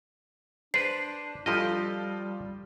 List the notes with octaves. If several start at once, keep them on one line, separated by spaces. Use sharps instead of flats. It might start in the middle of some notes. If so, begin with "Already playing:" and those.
D4 B4 C5 D5 C7
F3 G3 F4 G4 A4 D#5 C6